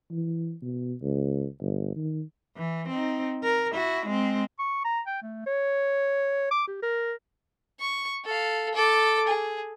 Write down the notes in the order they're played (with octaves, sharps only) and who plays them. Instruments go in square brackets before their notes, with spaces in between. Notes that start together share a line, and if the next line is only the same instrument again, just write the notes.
[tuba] E3
B2
C#2
G1
D#3
[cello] E3
C4 D#4
A#4
E4 F#4
G#3 C4
[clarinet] C#6
A#5
G5
A3
C#5
D6
G4
A#4
[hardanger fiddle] C#6
A4 F5
A4 D6
G#4